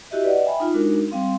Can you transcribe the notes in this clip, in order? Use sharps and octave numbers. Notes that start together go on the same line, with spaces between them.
E4 F#4 G4 D#5 E5
B4 D5 D#5 F#5
E5 G5 G#5 B5
D#4 F4
G#3 D4 D#4 F#4 A#4
G3 C4 F5 C6